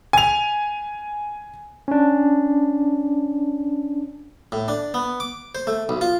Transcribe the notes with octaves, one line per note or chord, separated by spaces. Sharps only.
G#5 F7
C#4 D4
A2
D4
B3
D6
C5
A3
B1
F4